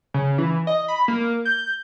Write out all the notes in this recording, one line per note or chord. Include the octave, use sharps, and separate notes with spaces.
C#3
E3
D#5
B5
A#3
G6